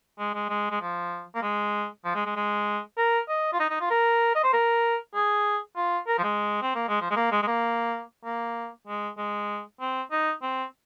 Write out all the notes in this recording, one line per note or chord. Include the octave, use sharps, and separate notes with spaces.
G#3
G#3
G#3
G#3
F3
A#3
G#3
F3
G#3
G#3
G#3
A#4
D#5
F4
D#4
D#4
F4
A#4
D#5
C5
A#4
G#4
F4
A#4
F3
G#3
C4
A#3
G#3
F3
G#3
A#3
G#3
G#3
A#3
A#3
G#3
G#3
C4
D#4
C4